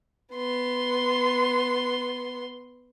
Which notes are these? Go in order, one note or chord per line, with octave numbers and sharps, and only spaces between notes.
B3 C6